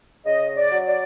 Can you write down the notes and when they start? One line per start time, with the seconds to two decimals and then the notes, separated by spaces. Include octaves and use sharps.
0.26 C#3 D#5
0.56 D5
0.71 F#3
0.86 D5